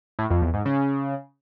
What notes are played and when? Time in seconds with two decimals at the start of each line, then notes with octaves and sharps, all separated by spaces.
0.19 A2
0.30 F2
0.42 E2
0.54 G#2
0.65 C#3